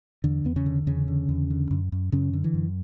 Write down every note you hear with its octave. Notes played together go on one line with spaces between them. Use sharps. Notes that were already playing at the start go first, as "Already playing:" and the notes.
E2 D3
E2 B3
C#3 C#4
D3
E2 C#3 C#4
D3
E2
D3
F#2
F#2
F#2 C#3 C#4
D3
E3
F#2